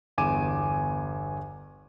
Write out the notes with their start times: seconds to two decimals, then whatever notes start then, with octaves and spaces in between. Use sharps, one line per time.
0.18 G1 E2 G#5 D6 D#7 E7